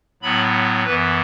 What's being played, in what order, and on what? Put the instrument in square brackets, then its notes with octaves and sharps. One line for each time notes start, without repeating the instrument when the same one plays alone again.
[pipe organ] A2 F#3 B3 B5
F#2 E3 B3 B4